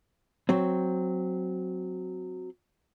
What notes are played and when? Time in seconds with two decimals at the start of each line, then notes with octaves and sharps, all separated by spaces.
0.49 F#3 C4